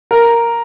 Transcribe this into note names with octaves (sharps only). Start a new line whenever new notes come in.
A#4